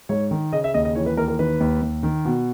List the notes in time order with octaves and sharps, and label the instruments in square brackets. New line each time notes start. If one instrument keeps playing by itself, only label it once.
[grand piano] G#2 C#5
D#3
C#3 D#5
E5
D#2 D#5
D#5
E3 C#5
B4
D#2 A#4
A#4
D#3 B4
D#2
D#2
D#3
B2